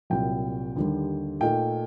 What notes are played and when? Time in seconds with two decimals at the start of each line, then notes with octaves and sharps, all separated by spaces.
0.10 C2 A#2 F#3 G5
0.76 D#2 D3 G3
1.41 A#2 A3 D#4 G5